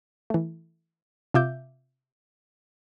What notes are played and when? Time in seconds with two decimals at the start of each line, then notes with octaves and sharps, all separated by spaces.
0.30 E3 A3
1.34 C3 F4 E5 D6 G6